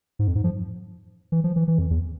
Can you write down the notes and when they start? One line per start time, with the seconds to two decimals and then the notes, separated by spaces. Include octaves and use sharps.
0.19 G#2
0.28 F2
0.35 G#2
0.44 F3
1.32 E3
1.44 F3
1.56 E3
1.68 E3
1.78 F2
1.90 E2